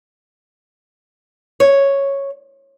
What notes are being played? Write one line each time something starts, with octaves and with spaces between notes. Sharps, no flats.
C#5